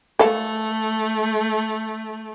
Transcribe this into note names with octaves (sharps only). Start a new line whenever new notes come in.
A3 A4 F5